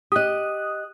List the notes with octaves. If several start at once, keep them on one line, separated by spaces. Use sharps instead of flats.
G4 D#5 D#6 F#6